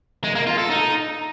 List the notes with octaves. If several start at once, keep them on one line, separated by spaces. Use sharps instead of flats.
G#3
A#3
F4
A4
D#4